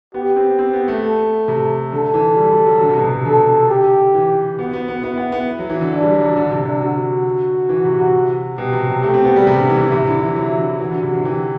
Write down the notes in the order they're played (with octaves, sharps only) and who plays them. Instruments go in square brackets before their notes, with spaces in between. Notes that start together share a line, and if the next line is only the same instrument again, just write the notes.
[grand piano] B3 [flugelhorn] G4
[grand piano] C4
C4
B3
A3
[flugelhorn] A4
[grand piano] C3
[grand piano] D3 [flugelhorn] A4
[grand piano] E3
G3
G3
F#3
D3
C3
B2
C3
[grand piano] D3 [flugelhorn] A4
[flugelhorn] G4
[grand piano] E3
[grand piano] B3 [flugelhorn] F#4
[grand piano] B3
B3
[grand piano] B3 [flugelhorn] E4
[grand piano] B3
B3
F#3
E3
D3
[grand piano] E3 [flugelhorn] D4
[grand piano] G3
F#3
F#3
D3
C3
C3
[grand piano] D3 [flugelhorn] F#4
[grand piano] E3
C3
C3
[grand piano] B2 [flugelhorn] G4
[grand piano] C3
F#3
[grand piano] A3 [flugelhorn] G4
[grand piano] C4
B3
G3
C3
D3
E3
E3
[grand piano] C3 [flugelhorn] E4
[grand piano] D3
E3
F#3
D3
[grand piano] E3 [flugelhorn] F#4
[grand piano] D3
C3
D3
[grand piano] E3 [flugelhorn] G4